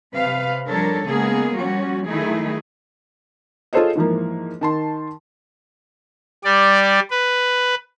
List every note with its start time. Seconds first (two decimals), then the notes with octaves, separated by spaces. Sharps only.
0.13 C3 B4 F5
0.67 F3 G3 D4 A4 A#4 C#5
1.07 C#3 G#3 A#3 B3 G#4
1.57 F3 G3 C#4 F#4
2.08 D#3 F#3 A3 D#4 E4 G#4
3.73 F4 G#4 A4 C5 C#5 D#5
3.95 G#2 E3 F3 A#3
4.61 D#3 A5 C6
6.44 G3 D5
7.10 B4